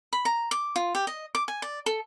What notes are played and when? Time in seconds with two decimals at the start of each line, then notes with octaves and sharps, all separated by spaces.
0.13 B5
0.25 A#5
0.51 D6
0.76 F4
0.95 G4
1.07 D#5
1.35 D6
1.48 G#5
1.62 D5
1.86 A4